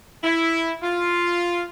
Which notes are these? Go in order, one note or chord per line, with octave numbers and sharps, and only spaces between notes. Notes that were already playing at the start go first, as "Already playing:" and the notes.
E4
F4